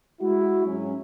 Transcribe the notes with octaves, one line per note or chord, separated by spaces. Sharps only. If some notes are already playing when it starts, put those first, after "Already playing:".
G#3 E4 F#4
G#2 F#3 C#4